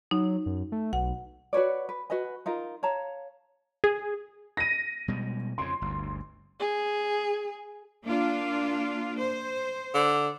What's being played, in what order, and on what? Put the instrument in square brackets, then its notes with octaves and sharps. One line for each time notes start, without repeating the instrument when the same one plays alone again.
[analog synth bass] F#3 [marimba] D#4
[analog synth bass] F#2
A3
[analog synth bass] B1 [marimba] F#5
[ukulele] F#4 B4 C#5 D5
B4
F#4 B4 D#5 G#5
D#4 F4 A#4
C#5 F5 A5 A#5
[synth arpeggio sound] G#4
[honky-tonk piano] A#6 D#7
[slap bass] B2 G3 G#3
[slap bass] F2 C#3 [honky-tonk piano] C6
[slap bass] G1 D2
[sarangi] G#4
[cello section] A#3 D4 F4
C5
[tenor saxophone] D3